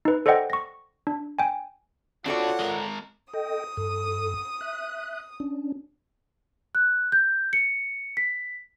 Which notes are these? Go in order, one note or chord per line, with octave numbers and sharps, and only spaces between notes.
D#4 B4
A4 C5 D5 D#5 F#5 G5
C#6 A#6
D4
G5 G#5
C4 D4 F4 F#4 A4 C#5 D5 F#5
G#3 A#4
A4 D#5 G5 D#6
G2 A4
E5 F#6
C#4 D4
F#6
G6
C#7
B6